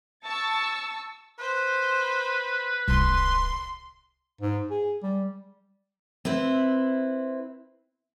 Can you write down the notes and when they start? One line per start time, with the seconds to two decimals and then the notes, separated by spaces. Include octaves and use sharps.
0.24 A5 C#6 E6 A6
1.39 B4 C5
2.88 D1 C2 C6
4.41 G#2
4.70 G#4
5.03 G3
6.25 C4 E4 B4